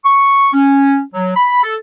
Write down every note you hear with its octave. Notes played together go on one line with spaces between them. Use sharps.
C#6
C#4
F#3
B5
A4